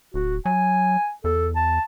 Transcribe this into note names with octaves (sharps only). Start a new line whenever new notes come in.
D1 F#4
F#3 G#5
E2 A4
A5